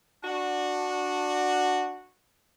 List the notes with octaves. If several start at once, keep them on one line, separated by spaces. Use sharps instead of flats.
D4 F#4